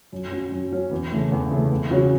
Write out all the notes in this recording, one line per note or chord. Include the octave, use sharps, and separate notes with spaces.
F#2
F#3 C#4
F#2
F#3 C#4
E2
C#3 E3 A3
E2
C#3 E3 A3
E2
C#3 F#3 C#4 F#4